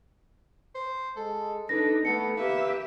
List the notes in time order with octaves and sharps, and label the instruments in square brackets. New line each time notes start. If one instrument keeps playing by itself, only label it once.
[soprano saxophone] C5
[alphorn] G#3 [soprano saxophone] A4
[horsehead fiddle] D4 D#4 [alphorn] A4 [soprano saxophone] B4 [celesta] A#6
[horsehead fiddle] A3 [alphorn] B3 [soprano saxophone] A4 [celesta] C#7
[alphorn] A#3 [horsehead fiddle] G4 E5 [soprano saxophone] B4